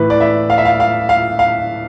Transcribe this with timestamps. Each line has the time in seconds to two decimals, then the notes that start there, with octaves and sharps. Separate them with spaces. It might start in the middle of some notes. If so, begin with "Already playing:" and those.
Already playing: A2 E3 B4
0.10 D5
0.21 E5
0.50 F5
0.58 E5
0.65 F5
0.80 F5
1.09 F5
1.39 F5